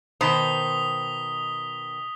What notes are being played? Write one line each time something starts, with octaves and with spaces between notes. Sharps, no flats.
B2 D#3 C5 D#6 B6 G7